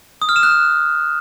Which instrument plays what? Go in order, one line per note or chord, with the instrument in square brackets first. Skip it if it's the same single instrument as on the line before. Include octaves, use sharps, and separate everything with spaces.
[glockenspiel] D#6
F6
E7
F#6